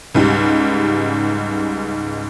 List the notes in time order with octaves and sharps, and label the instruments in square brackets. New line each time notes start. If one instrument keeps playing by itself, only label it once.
[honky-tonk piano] C#2 G#2 G3